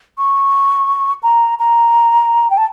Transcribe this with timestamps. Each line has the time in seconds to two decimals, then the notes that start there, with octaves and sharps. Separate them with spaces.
0.18 C#6
1.23 A#5
1.59 A#5
2.50 G5
2.57 A5